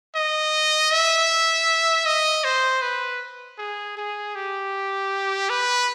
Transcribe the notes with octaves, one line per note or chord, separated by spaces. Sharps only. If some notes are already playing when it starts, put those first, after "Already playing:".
D#5
E5
D#5
C5
B4
G#4
G#4
G4
B4